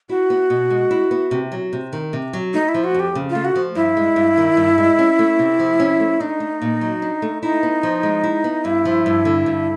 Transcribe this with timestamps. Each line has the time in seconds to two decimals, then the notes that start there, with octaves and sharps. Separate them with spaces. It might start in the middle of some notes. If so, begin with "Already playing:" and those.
0.09 E4 F#4
0.30 B3
0.50 B2
0.70 G#3
0.91 E4
1.11 B3
1.31 C3
1.52 F#3
1.73 C3
1.93 D#3
2.13 C3
2.33 F#3
2.53 A3 D#4
2.69 E4
2.74 F3
2.84 F#4
2.94 F2
3.00 G4
3.15 C#3
3.30 F4
3.35 A3
3.45 F#4
3.56 F3
3.75 G2 E4
3.97 G#3
4.16 G2
4.37 D#3
4.57 G2
4.78 G#3
4.99 C#4
5.19 A3
5.39 C3
5.59 F3
5.80 C#4
6.00 A3
6.20 D4 D#4
6.40 A3
6.62 A#2
6.81 F#3
7.02 D4
7.22 A3
7.42 D#4 E4
7.63 B3
7.83 F3
8.03 G#3
8.24 E4
8.44 B3
8.64 G2 E4
8.85 F3
9.06 G2
9.25 D3
9.46 G2